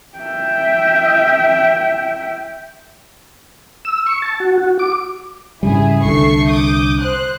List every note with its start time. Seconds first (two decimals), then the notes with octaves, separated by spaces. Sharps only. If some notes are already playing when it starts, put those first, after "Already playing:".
0.18 E5 G5
3.85 E6
4.06 C#6
4.22 A5
4.40 F#4
4.58 F#4
4.79 D6
5.63 G#2 C#3 G3 E4 G#4
6.04 C2 D3 A3 C#6 C7
6.49 D6 D#6 G6
6.99 C5 F#6